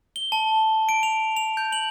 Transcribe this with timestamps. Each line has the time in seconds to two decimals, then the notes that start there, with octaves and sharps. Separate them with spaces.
0.16 G7
0.32 A5
0.89 D7
1.03 F7
1.36 F7
1.57 G6
1.72 F#7